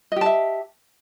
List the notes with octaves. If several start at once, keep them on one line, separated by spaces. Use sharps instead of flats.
G4 D#5 E5 A5